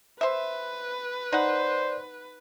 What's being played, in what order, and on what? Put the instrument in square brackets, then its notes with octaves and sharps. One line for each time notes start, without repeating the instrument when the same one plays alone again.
[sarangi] B4 [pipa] C5 E5
[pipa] D#4 F#5 [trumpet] C5 [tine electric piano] D5